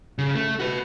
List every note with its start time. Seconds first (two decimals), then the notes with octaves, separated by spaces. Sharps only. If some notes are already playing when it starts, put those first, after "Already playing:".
0.18 C#3
0.35 A3
0.59 F#4 B4